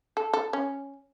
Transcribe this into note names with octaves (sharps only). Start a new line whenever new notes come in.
A4
A4
C#4